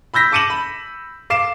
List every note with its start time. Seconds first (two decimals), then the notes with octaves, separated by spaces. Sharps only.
0.14 B5 E6 G6 A#6 B6
0.32 A5 D6 C#7 D#7 E7 F#7
0.50 B5
1.30 F5 D6 C7 E7